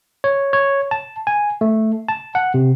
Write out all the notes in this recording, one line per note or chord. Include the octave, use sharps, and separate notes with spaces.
C#5
C#5
A5
G#5
A3
A5
F#5
C3